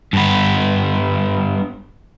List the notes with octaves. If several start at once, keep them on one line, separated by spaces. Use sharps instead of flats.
G2 B3